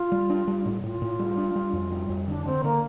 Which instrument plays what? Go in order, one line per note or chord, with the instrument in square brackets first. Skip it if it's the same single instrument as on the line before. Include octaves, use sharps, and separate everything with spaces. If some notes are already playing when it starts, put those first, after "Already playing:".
Already playing: [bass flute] F4
[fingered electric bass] G3
D4
G3
A2
[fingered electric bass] A2 [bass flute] F4
[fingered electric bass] A2
G3
D4
G3
F2
G3
F2
[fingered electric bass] D3 [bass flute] D4
[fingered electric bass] D3 [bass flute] C4
[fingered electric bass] D3 [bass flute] A#3